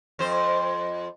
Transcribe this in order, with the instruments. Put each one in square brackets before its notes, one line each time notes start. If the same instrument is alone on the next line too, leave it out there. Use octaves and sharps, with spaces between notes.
[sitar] F2 C5